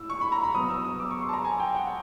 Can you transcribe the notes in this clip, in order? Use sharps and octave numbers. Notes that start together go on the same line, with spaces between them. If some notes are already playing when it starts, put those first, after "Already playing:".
Already playing: A2 E6
C#6
B5
A#5
B5
B2 F#3 B3 D#6
E6
D#6
D6
C#6
C6
A5
A#5
G#5
G5
F#5